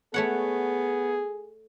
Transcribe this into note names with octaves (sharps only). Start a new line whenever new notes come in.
A3 B3 G#4 C#5 F#5